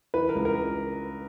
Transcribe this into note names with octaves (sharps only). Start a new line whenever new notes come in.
E3 B4
A#4
C#2
A#4